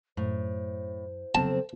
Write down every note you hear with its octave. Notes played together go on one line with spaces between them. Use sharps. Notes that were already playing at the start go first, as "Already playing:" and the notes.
F#2 A2 C5
F2 C#3 F#3 B3 C4 A5